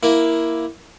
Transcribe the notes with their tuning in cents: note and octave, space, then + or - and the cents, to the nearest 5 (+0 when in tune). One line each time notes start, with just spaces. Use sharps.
A#3 +5 E4 +0